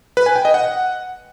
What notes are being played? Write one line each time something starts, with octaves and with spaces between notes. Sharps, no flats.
B4
G#5
G5
D#5
F#5